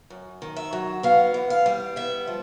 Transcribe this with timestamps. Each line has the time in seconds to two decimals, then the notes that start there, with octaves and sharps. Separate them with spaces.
0.10 F#2
0.42 D#3
0.56 E5
0.73 F#3
1.03 B3 F5
1.34 E3
1.50 F5
1.66 G3
1.96 B3 E5
2.27 F3